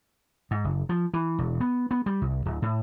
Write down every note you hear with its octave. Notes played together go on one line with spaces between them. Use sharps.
G#2
F#1
F3
E3
E1
B3
B3
G3
C2
D1
A2